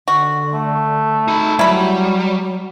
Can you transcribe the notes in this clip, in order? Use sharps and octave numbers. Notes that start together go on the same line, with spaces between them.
D3 F#4
A3
D#4 B5
F#3 G3 E4 B5